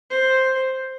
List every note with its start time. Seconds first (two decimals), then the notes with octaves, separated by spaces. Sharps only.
0.10 C5